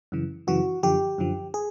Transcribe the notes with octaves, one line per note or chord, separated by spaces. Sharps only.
F#2 C#3 E3
F#2 C#3 E3 F#4
F#2 D3 F3 G4
F#2 D3 F3
G#4